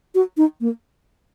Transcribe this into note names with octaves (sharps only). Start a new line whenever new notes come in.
F#4
D#4
A#3